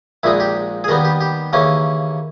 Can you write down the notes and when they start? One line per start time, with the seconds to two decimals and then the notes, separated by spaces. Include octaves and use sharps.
0.23 A#1 A#2 G#3 D#4 E4
0.40 G4
0.84 G#4
0.88 D#2 D#3 G3 B3 A#4
1.05 G4
1.21 G4
1.53 D#2 C#3 E3 A#3 C#4